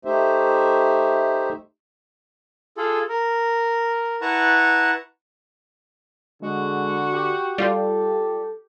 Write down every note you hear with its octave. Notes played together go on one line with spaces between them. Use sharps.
A3 D#4 G4 C5 E5
F4 G#4 A4
A#4
E4 B4 F#5 A5 A#5 C#6
D3 G#3 F#4
G4
G3 F4 A4